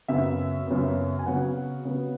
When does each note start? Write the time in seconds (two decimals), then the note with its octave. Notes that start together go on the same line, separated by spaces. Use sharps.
0.08 F#2 C#3 F#3 B3 E5
0.67 F#2 C#3 F#3 B3
1.19 G#5
1.26 C#3 F#3 B3 F#5
1.85 C#3 F#3 B3